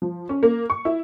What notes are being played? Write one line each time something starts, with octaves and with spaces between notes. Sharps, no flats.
F3
C#4
A#3
C#6
E4